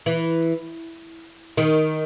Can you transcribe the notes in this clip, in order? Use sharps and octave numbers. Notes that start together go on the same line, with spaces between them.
E3
D#3